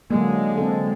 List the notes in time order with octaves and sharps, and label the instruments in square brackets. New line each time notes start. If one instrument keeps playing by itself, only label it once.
[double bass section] D3 G#3 [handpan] F#3 A#3
[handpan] C4 A4